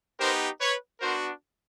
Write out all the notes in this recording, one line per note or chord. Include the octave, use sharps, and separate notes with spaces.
B3 D#4 G4 A#4 C5
B4 C#5
B3 D4 F#4 A#4 C5